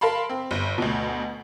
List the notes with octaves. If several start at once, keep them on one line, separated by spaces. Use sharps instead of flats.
A#4 F5 A5 B5 C6
C4
G1
D2 B2